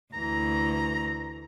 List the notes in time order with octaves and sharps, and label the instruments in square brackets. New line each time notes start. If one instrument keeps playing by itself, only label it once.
[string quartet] D2 E3 [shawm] A#5